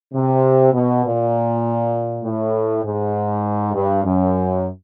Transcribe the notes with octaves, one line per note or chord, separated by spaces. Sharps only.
C3
B2
A#2
A2
G#2
G2
F#2